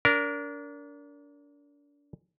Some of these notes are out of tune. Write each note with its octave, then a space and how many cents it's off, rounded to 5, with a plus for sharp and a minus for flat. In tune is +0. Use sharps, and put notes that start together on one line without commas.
D4 -35 A#4 +0